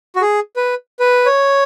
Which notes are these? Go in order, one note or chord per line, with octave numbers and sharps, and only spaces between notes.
F#4
G#4
B4
B4
C#5